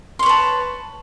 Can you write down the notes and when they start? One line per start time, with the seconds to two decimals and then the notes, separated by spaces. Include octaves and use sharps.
0.19 C6
0.23 C#5
0.26 B4
0.29 A5